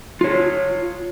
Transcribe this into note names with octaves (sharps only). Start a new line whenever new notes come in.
F4 C#5